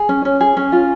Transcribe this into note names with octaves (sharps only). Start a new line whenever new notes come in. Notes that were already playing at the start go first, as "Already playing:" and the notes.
Already playing: G#4 G#5
C#4
C#4
G#4
C#4
F4